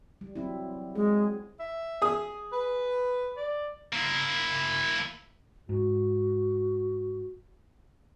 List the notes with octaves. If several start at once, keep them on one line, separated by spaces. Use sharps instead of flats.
G3
F#3 C4 E4
G#3 G#4
E5
G#4 D#6
B4
D5
A#3 E4
G#2 F#4